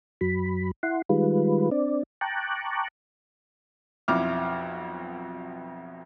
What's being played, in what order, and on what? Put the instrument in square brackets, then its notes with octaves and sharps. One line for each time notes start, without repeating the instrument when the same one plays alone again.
[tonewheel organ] F#2 F#3 B5
E4 F#5 C6
D#3 G3 G#3 F4 B4
C4 D4 D5
G5 A5 A#5 C#6 D6 F#6
[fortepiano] B1 F2 E4 D6 F6